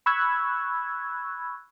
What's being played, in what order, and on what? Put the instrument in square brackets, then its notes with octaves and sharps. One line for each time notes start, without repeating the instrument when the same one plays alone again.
[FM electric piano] B5 C#6 E6 F#6 G#6